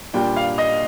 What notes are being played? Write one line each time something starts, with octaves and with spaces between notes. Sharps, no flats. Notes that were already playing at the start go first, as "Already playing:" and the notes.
A#2 G3 A#3 D4 F4 G5
F5
D#5